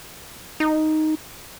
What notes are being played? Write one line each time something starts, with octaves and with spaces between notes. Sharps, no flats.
D#4